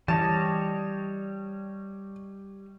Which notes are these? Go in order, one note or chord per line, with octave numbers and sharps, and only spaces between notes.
E3 G3 C#5 D#5 A5